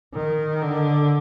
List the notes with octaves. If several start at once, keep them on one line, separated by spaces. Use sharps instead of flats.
D#3
D3